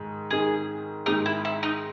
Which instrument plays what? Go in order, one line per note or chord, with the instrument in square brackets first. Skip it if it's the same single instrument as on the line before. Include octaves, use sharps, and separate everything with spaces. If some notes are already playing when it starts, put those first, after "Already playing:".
Already playing: [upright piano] G#2 D#3 G#3
[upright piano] G#2 D#3 G#3 [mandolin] G#4
[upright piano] G#2 D#3 G#3 [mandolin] D#4
[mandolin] E4
E4
D#4